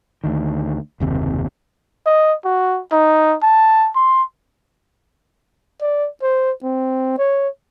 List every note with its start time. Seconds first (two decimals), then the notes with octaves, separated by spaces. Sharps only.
0.24 D2 D#3
1.00 F#1 D#2 C3
2.06 D#5
2.45 F#4
2.92 D#4
3.43 A5
3.95 C6
5.81 D5
6.22 C5
6.63 C4
7.18 C#5